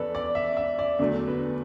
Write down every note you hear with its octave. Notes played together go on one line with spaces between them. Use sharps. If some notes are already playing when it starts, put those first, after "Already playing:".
Already playing: E2 E3 A4 B4 D5
D5
E5
E5
D5
E2 D3 F#3 A3 D4
B4